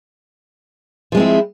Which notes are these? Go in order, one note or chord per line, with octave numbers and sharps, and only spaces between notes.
F3 G#3 C4 E4